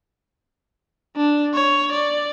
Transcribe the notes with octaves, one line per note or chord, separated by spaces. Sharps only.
D4
C#5
D5